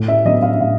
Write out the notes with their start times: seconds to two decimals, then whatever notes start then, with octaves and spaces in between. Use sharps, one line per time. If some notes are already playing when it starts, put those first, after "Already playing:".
Already playing: A2
0.08 E5
0.25 F#3 B3 D4 D#5
0.42 F5
0.60 A2 F5